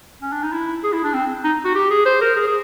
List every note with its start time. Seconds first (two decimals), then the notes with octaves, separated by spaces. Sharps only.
0.22 C#4
0.32 D4
0.43 D#4
0.53 E4
0.83 G#4
0.93 E4
1.03 D4
1.14 C4
1.44 D#4
1.65 F#4
1.75 G4
1.90 G#4
2.06 C5
2.21 A#4
2.36 G#4
2.47 G#4